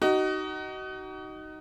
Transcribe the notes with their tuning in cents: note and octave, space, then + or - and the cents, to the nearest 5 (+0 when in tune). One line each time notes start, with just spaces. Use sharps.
D#4 +0 F#4 +35